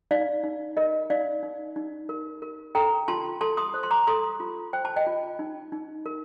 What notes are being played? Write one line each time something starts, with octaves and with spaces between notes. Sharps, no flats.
D#4 D5 F5
D#4
A#4 D#5
D#4 D5 F5
D#4
D#4
A#4
A#4
A4 G5 A#5
F4 A5 C6
A4 A5 C6
C6 D#6
C5
C6
A#5 D6
A4 C6 D#6
F4
C5 G5
A5
D#5 G5
F4
D#4
D#4
A#4